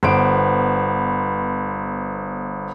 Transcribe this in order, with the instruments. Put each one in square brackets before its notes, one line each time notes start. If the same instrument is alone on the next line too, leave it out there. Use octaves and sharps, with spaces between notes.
[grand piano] G1 D7 [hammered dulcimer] B3 C5